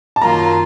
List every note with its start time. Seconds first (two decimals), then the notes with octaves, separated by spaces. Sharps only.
0.16 A5
0.21 F#2 D#3 F#3 A#3 F4 A#5